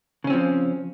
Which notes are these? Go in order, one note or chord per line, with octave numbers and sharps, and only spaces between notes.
C#3 F3 C4 C#4